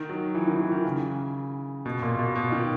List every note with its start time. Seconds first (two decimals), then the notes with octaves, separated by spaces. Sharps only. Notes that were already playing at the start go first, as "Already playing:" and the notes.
Already playing: D#3
0.09 F#3
0.35 E3
0.48 D#3
0.55 E3
0.60 D#3
0.71 D#3
0.84 C#3
1.86 B2
2.02 A#2
2.19 B2
2.35 B2
2.52 D#3